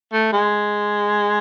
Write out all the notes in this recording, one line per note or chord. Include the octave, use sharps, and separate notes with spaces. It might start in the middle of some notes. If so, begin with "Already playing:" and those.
A3
G#3